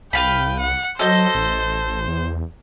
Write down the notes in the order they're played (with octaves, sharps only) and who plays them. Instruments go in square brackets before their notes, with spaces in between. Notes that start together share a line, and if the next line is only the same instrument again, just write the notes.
[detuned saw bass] C2 [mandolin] B4 F5 B5 [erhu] G5
[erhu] F#5
[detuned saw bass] F#3 [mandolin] A4 D#5 G6 [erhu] C5
[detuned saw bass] A1
E2